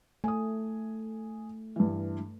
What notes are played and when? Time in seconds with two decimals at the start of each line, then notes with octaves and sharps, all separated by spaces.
0.24 A3 G#5 D#6
1.76 G2 E3